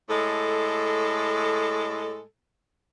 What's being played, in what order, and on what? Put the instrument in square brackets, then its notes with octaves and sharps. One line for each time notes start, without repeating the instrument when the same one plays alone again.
[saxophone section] A2 G#3 A4